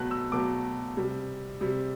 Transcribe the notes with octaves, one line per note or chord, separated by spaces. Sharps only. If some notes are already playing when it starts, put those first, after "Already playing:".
Already playing: B2 F#3 A3 F#6
E6
B2 F#3 A3 D6
C3 G3
C3 G3